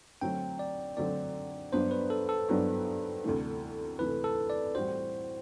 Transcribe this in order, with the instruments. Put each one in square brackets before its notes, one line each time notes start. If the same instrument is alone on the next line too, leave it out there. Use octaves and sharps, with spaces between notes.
[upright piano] D3 F#3 A3 C4 [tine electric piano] G5
[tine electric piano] D5
[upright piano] D3 F#3 A3 C4 [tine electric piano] D5
[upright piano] G2 F#3 B3 D4 [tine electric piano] C5
[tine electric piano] B4
A4
A4
[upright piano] G2 F#3 B3 D4
D2 C3 E3 A3
[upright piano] D2 C3 E3 A3 [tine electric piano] B4
[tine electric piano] A4
D5
[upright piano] A2 E3 G3 C4 F#4 [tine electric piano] C5